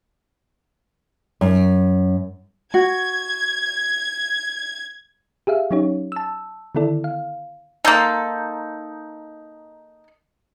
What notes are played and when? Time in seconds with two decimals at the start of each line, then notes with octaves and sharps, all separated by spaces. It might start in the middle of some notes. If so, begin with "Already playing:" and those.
1.41 F#2
2.74 F#4 G#6
5.47 G4 G#4 E5 F5
5.71 F#3 C#4 D#4 G4 C#5
6.12 A5 E6
6.75 D3 D#3 B3 E4 A4 D5
7.04 F5
7.85 A#3 D#4 A4 C6 G6